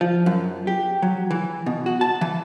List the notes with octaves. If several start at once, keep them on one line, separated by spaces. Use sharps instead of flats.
F3
F#2
G4
F#3
E3
B2
F#4
A5
E3